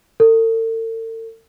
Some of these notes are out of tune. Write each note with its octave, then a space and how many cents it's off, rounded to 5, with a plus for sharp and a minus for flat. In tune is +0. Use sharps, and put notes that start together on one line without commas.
A4 +45